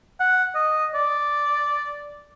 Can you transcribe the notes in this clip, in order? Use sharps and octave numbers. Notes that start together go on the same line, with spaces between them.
F#5
D#5
D5